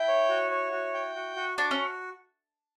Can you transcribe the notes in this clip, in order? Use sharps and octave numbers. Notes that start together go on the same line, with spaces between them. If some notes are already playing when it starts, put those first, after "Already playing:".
Already playing: E4 G5
C#5
F#4
C#5
F#4
G5
F#4
F#4
D4 F#4
C#4